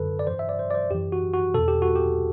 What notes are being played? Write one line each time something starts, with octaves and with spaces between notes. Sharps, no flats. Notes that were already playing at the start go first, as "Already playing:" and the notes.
Already playing: F#2 D3 A4 B4
D5
G2 E3 C5
E5
D5
C5
D5
C5
F#2 E3 G4
F#4
F#4
E2 B2 A4
G4
F#4
G4